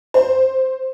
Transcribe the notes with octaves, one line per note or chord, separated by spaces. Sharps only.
C5